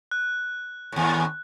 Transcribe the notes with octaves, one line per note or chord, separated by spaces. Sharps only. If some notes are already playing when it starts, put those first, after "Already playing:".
F#6
D#2 A2